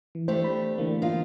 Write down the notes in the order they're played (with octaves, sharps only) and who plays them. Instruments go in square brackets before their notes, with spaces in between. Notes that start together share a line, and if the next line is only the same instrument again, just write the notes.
[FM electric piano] E3
[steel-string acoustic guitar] A3 D4 G4 [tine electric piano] C5
[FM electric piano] B5
D3 E3 A#3
[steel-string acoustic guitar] D4 D#4 F4